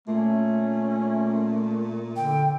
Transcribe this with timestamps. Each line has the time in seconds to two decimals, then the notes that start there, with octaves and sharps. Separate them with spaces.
0.08 A#2 A3 C#4
2.16 D3 G5